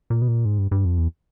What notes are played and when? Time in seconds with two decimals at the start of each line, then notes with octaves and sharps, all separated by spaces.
0.10 A#2
0.22 B2
0.28 A#2
0.45 G#2
0.58 G2
0.71 G2
0.85 F2
0.98 E2